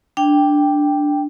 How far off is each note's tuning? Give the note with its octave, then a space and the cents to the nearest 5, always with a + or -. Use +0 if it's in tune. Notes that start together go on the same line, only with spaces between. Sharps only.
D4 +0 G5 +0